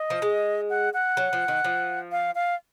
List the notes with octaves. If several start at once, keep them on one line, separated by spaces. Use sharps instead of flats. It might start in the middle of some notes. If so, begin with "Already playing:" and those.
Already playing: D#5
F3
G#3
F#5
F#5
F#3
F3
D#3
F3
F5
F5